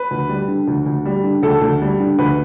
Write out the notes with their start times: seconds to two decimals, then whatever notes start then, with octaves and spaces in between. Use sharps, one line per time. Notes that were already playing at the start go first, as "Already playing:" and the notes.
Already playing: B4
0.11 D2
0.29 G3
0.48 D3
0.68 D2
0.86 D2
1.05 G3
1.24 D3
1.43 D2 A4
1.62 D2
1.82 G3
2.00 D3
2.19 D2 B4